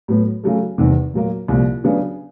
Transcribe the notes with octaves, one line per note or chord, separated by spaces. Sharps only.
A2 F#3 B3
C#3 F#3 A3
E2 C3 D#3 G3
A#2 F#3 A#3
C2 A#2 F3
C#3 F#3 B3 D4